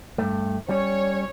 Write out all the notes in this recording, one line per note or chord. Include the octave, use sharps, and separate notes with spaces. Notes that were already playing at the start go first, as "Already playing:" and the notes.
G2 A3
G3 C#4 C#5